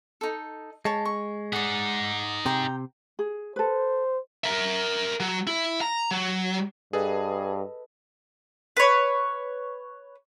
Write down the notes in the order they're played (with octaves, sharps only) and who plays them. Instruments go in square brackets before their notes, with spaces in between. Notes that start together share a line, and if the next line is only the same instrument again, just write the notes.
[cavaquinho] D#4 A4
[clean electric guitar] G#3 [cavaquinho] C#5 A5
[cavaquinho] C#6
[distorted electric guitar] D#4 G#4 [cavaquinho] D5 F#5
[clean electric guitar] C3 [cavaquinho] G5 A#5
[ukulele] G#4
[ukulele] A4 B4 [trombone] C5
[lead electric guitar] A#4 E5
F#3
E4
A#5
F#3
[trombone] G2 [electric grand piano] G#4 [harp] A4 B4 D#5
[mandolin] B4 C#5